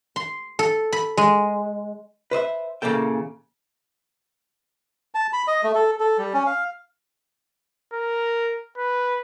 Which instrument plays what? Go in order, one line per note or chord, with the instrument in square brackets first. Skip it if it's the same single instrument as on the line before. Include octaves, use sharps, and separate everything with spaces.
[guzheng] C6
A4
B5
G#3
[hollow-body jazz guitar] B4 C5 D#5 E5
A#2 C#3 E3 A#3 A4 G5
[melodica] A5
B5
D#5
A3
A4
A4
G3
C#4
F5
[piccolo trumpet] A#4
B4